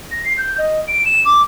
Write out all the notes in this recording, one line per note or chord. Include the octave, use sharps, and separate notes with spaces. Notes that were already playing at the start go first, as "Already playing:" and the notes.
A#6
C7
G6
D#5
D7
E7
D6